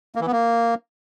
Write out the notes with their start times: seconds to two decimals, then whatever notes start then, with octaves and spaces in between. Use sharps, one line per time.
0.15 A#3
0.21 E3
0.27 B3
0.32 A#3